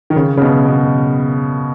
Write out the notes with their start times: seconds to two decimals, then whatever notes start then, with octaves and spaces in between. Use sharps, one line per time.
0.10 D#3
0.16 C#3
0.37 C#3
0.42 B2
0.68 B2